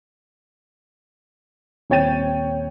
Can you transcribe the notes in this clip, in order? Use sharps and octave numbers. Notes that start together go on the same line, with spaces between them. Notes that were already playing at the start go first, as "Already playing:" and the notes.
D#1 C4 C#5 G5 A6 D#7